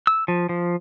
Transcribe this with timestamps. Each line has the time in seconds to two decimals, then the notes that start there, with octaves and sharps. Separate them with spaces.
0.07 E6
0.28 F3
0.49 F3